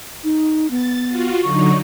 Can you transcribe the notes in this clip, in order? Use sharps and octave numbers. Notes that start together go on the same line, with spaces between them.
D#4
B3 A6
F4 F#4
D3 F#3 D#4 C#6